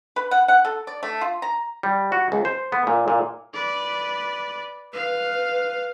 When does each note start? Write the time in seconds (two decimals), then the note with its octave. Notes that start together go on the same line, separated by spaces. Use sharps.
0.16 B4
0.31 F#5
0.48 F#5
0.65 A4
0.87 D5
1.03 A3
1.21 F4
1.42 A#5
1.83 G3
2.12 F#4
2.32 C#2
2.45 C5
2.72 B3
2.87 A#2
3.08 A#2
3.53 B4 D5
4.93 B4 F5